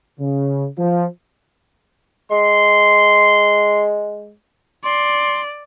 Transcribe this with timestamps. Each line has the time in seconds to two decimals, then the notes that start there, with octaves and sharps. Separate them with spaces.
0.20 C#3
0.78 F3
2.31 G#3 C6
4.84 D5 C6